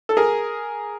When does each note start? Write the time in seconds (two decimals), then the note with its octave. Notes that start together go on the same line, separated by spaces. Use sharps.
0.09 A4
0.17 G#4 A#4